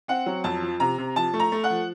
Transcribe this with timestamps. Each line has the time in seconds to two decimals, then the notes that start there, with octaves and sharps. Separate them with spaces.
0.08 C4 F#5
0.26 F#3
0.44 F2 A5
0.62 F3
0.80 C3 A#5
0.98 C3
1.16 F3 A5
1.33 A3
1.40 A#5
1.52 A3
1.64 F#5
1.70 F3